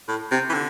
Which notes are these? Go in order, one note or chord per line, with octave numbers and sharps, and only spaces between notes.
A2
C3
E3
D3